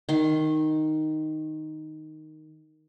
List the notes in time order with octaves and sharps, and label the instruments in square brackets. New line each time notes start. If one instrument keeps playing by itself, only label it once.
[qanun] D#3 C6